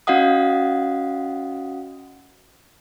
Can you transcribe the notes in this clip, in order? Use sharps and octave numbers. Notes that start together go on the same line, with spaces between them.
C#4 F#4 D#5 F5 F#5 D#6